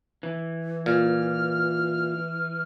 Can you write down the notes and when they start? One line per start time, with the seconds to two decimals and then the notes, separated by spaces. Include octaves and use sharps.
0.23 E3
0.86 A#2 F6